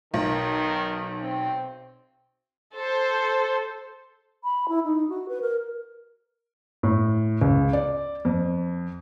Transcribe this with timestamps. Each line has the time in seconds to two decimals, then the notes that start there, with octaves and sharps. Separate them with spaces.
0.14 B1 D#3
1.22 C4
2.75 A4 C5
4.44 B5
4.68 E4
4.85 D#4
5.09 F#4
5.29 B4
5.42 A#4
6.83 A2
7.42 C#2
7.73 D5
8.25 F2